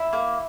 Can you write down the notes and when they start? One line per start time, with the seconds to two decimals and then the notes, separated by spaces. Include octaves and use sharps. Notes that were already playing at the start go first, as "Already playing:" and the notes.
Already playing: E4
0.13 A#3